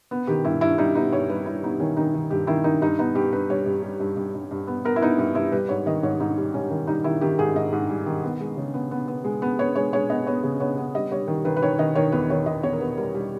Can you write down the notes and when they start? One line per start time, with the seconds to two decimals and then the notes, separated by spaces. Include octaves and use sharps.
0.11 B3
0.27 D#3 G4
0.45 G2 E4
0.61 G2 E4
0.78 G3 D#4
0.95 B3 D#4
1.12 G2 C#5
1.30 G3 B4
1.46 G3 E4
1.63 B3 D#4
1.80 D#3 C#4
1.97 D#3 D#4
2.14 D#3
2.31 G2 G4
2.47 D#3 E4
2.64 D#3 D#4
2.81 G2 D#4
2.99 B3 D#4
3.15 G2 G4
3.33 G2 B4
3.49 G3 C#5
3.66 G2
3.83 G3
4.00 G2
4.17 G2
4.34 G2
4.51 G2
4.67 B3
4.85 B3 A#4
4.96 E4
5.01 B3 D#4
5.18 G2 E4
5.35 G2 E4
5.52 G3 B4
5.69 G#2 C#5
5.86 D#3 D#5
6.03 G#2 C#5
6.20 G#2 D#4
6.38 G3
6.54 G#2 C#4
6.70 D#3
6.87 G3 D#4
7.04 D#3 E4
7.21 D#3 G4
7.39 G#2 G#4
7.55 G#2 D#5
7.72 G#2
7.90 G3
8.06 D#3
8.23 B3
8.40 G#3
8.57 C#3
8.74 B3
8.91 B3
9.08 B3
9.24 G#3
9.42 B3
9.59 B3 C#5
9.76 G#3 C#5
9.93 G#3 C#5
10.10 B3 D#5
10.27 B3 C#5
10.43 C#3
10.60 B3 C#5
10.77 B3
10.95 G3 D#5
11.11 G3 C#5
11.28 D#3
11.45 D#3 B4
11.57 B4
11.62 D#3 C#5
11.78 D#3 D#5
11.95 D#3 C#5
12.12 E2 B4
12.30 D#3 C#5
12.46 D#3 D#5
12.63 E2 C#5
12.73 A#4
12.80 B3 B4
12.97 G3 A#4
13.14 G3